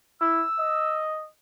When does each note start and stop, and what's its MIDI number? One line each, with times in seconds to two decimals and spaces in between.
0.21 0.44 64
0.21 1.03 88
0.59 1.29 75